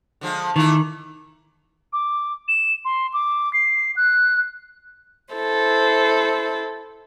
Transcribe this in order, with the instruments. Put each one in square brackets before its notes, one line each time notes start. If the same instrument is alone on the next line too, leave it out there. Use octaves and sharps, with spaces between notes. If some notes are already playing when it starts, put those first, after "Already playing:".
[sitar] D3 F3 G#3
[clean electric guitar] D#3 [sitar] E3 A3 E4
[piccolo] D6
E7
C6
D6
C7
F#6
[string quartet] E4 A4 C5